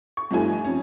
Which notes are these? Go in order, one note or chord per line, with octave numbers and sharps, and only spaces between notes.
C#6
G2 F3 A3 D#4 G#5
F2 C#4